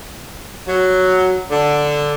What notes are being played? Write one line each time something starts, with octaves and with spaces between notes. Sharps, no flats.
F#3
D3